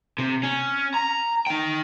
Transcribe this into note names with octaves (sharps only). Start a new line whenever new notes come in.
C3
C#4
A#5
D#4 G5